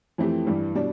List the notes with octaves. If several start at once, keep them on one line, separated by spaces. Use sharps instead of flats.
F2 E3 A3 C4 G4
G2 E3 G3
B2 G3 D4